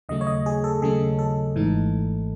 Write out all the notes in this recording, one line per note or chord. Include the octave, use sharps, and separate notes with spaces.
D#2 C#3 F#3 A3 C#4 D#5
C#5
D#5
G#4
A4
D#2 C#3 F#3 A3 C#4 G#4
A4
G#1 G#2 E3 A3 D#4